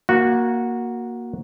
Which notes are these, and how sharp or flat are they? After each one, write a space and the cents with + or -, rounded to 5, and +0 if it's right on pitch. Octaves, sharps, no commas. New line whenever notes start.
A#3 +10 F#4 -10